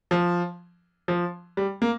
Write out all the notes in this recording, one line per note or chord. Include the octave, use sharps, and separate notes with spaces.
F3
F3
G3
A#3